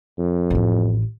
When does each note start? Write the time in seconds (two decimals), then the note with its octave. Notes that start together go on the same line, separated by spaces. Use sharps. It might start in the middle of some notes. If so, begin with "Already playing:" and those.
0.19 F2
0.50 A1 E4